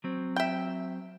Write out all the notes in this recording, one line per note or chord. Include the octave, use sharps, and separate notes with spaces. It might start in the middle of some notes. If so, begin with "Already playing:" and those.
F#3 C4
E5 G5